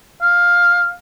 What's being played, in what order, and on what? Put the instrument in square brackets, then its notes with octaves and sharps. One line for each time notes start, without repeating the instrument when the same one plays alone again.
[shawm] F5